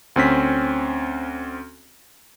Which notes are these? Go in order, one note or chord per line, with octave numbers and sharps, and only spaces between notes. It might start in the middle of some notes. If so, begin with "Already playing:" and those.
D2 C4 C#4 B6